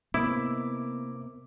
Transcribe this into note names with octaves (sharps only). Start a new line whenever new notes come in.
C3 A#3 B3 E4 D#5 D6